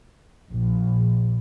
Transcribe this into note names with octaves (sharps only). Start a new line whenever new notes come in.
A#1